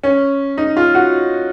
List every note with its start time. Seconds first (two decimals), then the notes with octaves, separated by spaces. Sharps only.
0.04 C#4
0.58 D#4
0.77 F4
0.95 F#4